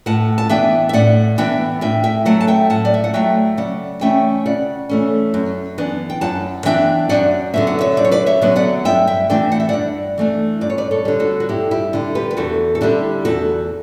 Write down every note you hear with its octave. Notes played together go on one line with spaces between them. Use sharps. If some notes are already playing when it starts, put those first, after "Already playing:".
A2 F#5 A5
A5
E3 B3 D4 E5 G5
E5
A2 D5 F#5
E3 B3 D4 E5 G5
A2 E5 G5
E5 G5
F#3 A3 F#5 A5
A5
E5 G5
A2 F#5 A5
D5
E5
F#5
F#3 A3 E5 G5
C#3 D5 F#5
E3 A3 C#4 E5 G5
C#3 D5 F#5
E3 A3 C#4
F#2
E3 B3 D4
G5
F#2 F#5 A5
E3 B3 D4 E5 G5
F#2 D5 F#5
D3 F#3 B3 E5
F#5
C#5 E5
F#2 D5
C#5
B4 D5
C#5 E5
D3 F#3 B3
D5 F#5
G2 E5 G5
E5 G5
E3 A3 D4 E5 G5
F#5
E5
G2 D5 F#5
E3 A3 D4
G2 D5
C#5
B4 D5
A4 C#5
D3 G3
F#4 A4
F#4
G2 E4 G4
E4 G4
D3 G3
G4 B4
B4
E2 F#4 A4
A4
D3 G3 D4 E4 G4
E2 F#4 A4